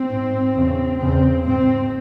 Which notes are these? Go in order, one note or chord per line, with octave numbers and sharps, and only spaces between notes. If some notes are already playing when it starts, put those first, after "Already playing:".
Already playing: C4
G#2
E2 C#3
E2 C#3 C4
G#2 C4